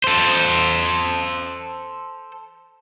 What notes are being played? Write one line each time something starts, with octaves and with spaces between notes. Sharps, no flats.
A4 C5